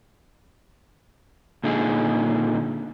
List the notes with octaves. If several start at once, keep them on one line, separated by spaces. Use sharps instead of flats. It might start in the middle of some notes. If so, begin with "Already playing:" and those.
A#2 D3 D#4 G#4